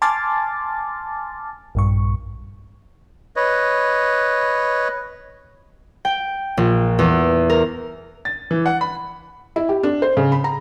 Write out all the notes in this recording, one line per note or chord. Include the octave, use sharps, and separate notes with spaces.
G#5 A5 C6 D6 F6 A6
A#1 G2 C#6
B4 C#5 D#5
G5
A#1
E2
A#4
A6
E3
F#5
B5
E4
G4
D4
C5
C#3
B5
A#5